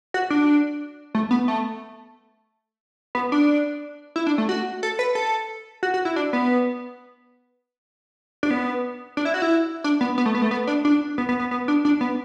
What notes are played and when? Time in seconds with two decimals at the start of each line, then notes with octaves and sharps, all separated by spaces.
0.14 F#4
0.30 D4
1.15 A3
1.31 B3
1.48 A3
3.15 B3
3.32 D4
4.16 E4
4.27 D4
4.38 A3
4.49 F#4
4.83 A4
4.99 B4
5.15 A4
5.83 F#4
5.94 F#4
6.05 E4
6.16 D4
6.33 B3
8.43 D4
8.51 B3
9.17 D4
9.25 E4
9.34 F#4
9.42 E4
9.84 D4
10.01 B3
10.18 B3
10.26 A3
10.35 B3
10.42 A3
10.51 B3
10.67 D4
10.85 D4
11.18 B3
11.29 B3
11.39 B3
11.51 B3
11.68 D4
11.85 D4
12.01 B3